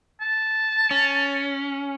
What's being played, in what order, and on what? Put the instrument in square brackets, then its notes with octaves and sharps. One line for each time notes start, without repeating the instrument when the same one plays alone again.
[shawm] A5
[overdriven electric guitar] C#4